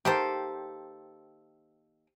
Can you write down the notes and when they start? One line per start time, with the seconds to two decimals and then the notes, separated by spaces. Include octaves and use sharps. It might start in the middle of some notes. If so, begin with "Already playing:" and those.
0.05 D#3 A#3 G4 A4 C5